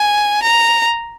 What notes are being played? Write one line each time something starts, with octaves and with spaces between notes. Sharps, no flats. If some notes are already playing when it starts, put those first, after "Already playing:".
Already playing: G#5
A#5